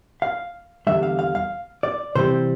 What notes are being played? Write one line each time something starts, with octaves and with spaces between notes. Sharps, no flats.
F5
E2 D3 G3 E5
F5
F5
F5
D5
C3 E3 G3 C4 C5